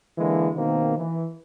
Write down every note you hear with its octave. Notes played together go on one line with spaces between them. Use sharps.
D3 E3 G#3 A#3
B2 D#3 A#3 C4
E3